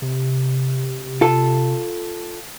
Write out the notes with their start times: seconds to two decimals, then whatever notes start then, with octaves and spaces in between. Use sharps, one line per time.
0.02 C3
1.21 F4 A4